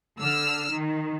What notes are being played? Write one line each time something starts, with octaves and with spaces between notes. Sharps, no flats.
D3 E6 F6
D#3